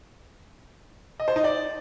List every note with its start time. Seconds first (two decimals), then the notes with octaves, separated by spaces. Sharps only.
1.20 D#5
1.28 C5
1.36 D#4
1.44 D5